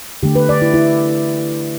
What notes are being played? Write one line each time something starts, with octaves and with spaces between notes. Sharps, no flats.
D3 A3 G4
B4
D5
E4
E4